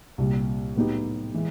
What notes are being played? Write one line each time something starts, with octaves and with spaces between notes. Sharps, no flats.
C2 A#2 G3
A2 F#3 B3 D#4 G4
E3 G#3